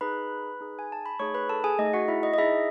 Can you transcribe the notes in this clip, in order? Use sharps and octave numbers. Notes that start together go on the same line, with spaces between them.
D#4 G#4 B4 B5
D#4 G#4
G#5
A5
B5
A3 D#4 G#4 C#5 C#6
B4 B5
A4 A5
G#4 G#5
A3 D#4 G#4 D#5
F#4 F#5
E4 E5
D#5
D#5
D#4 E4 G#4 E5